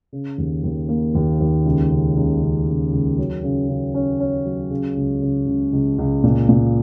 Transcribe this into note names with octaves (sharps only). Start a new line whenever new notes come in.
C#3
D#2
D#2
A#3
D#2
D#2
C#2
C#3
C#2
C#3
C#2
C#2
F#3
C#3
C#3
C#4
C#4
F#3
C#3
C#2
C#3
C#2
C#2
C#2
A#2
A#2